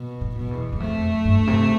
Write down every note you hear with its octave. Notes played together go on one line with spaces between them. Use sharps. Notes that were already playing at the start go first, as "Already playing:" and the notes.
Already playing: B2
A2
F2 B2
E2
E2
F2 A3
F2
G2
C3